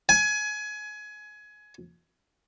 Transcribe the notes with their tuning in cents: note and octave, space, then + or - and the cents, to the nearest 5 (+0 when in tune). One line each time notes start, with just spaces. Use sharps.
G#5 +20